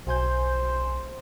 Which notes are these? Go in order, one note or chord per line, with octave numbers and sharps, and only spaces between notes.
B1 C5 G#5 G6